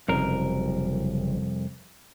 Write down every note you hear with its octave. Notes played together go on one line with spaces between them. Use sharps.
F#1 C2 F2 A#4